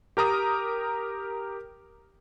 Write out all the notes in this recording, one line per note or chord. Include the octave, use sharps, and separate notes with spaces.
G4 A#4 A#5 D#6